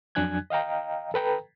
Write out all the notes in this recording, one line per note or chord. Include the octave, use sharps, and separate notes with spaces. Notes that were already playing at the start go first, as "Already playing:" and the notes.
F2 F#3 D4 G#5 F#6 G#6
D#5 F5 G5 A#5
A4 B4 G5 A#5